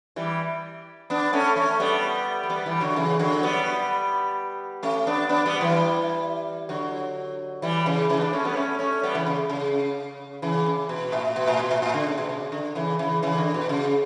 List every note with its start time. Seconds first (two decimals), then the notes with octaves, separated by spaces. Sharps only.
0.16 E3 G3
1.10 B3 D4
1.33 A3 C#4
1.56 A3 C#4
1.80 G3 B3
2.43 A3
2.49 G3 B3
2.66 E3 G3
2.80 D3 F#3
2.96 C#3 E3
3.19 D3 F#3
3.43 G3 B3
4.83 A3 C#4
5.07 B3 D4
5.29 B3 D4
5.46 G3 B3
5.60 E3 G3
6.69 D3 F#3
7.62 E3 G3
7.86 C#3 E3
8.10 C#3 E3
8.21 B3 D4
8.33 A3 C#4
8.44 G3 B3
8.56 A3 C#4
8.79 A3 C#4
9.03 G3 B3
9.15 C#3 E3
9.26 C#3
9.50 C#3
10.42 C#3 E3
10.66 C#3
10.89 B2
11.12 A2
11.36 B2
11.48 A2
11.59 B2
11.71 A2
11.82 A2
11.94 D3
12.07 C#3
12.18 B2
12.29 C#3
12.52 D3
12.75 C#3 E3
12.99 C#3 E3
13.23 C#3 E3
13.38 D3
13.54 B2
13.69 C#3